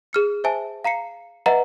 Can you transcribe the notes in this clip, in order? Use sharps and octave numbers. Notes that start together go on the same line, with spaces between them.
G#4 F6 C#7
C5 E5 G#5 A5
F5 A#5 C7 C#7
B4 D#5 E5 F#5 A#5